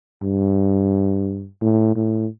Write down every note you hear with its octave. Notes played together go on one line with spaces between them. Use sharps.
G2
A2
A2